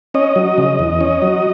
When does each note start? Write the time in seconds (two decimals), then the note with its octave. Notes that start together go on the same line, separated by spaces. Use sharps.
0.14 C#4 D#5
0.36 F#3
0.58 C#3
0.79 E2
1.01 C#4
1.22 F#3